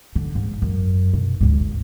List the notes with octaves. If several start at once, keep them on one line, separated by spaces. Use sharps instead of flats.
D3
G#2
F#2
B2
D2 G#2